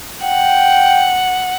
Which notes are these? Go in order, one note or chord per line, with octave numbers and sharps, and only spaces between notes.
F#5 G5